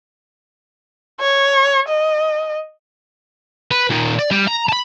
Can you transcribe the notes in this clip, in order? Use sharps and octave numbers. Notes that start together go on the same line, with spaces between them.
C#5
D#5
B4
A#2 D#3
D5
G3
A#5
A5 B5